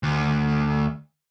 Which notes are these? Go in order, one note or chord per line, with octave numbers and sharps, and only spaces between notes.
D2